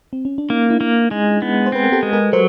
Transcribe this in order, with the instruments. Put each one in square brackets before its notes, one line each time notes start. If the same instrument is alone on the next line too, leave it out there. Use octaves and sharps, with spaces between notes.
[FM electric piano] C4
C#4
D4
[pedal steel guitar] A#3 [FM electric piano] C#4 D#4
[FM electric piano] D4 E4
[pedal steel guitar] A#3
G#3
B3
[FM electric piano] C5
[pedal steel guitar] C4 [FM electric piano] B4
[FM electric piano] A#4
G4 A4
[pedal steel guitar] G#3
[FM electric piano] G#4 A#4
[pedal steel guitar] F#3 [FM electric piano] A#4 C5